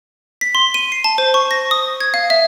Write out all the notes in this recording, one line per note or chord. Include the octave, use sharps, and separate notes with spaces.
B6
C6
D#7
C7
A5
C5
C#6
A#6
D#6
G#6
F5
E5